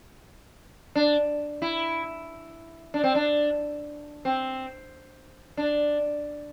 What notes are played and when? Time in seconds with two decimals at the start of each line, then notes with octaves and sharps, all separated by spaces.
0.95 D4
1.62 E4
2.94 D4
3.04 C4
3.15 D4
4.25 C4
5.57 D4